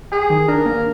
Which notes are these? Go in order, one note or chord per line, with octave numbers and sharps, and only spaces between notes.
G4 G#4
D#3
D4 A#4
A#3